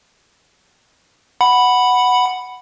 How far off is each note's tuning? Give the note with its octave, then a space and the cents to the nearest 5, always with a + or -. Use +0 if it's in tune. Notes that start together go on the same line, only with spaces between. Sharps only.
F#5 +0 B5 +0